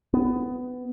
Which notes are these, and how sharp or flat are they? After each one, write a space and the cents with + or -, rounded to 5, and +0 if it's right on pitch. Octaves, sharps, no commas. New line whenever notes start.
B3 +20